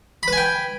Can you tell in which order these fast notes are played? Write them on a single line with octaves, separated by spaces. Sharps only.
B5 B4 G#5 G5